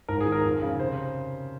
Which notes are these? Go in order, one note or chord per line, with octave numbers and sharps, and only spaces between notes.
G#2 A#4
G#4
D#3
A#4
F2
C#3
C3 C5